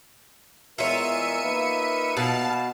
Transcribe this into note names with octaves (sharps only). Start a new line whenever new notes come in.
E2 G#3 F4 A#4 C#5 E5 C#7 D#7
A#3 D#4 B4
B2 F5 A5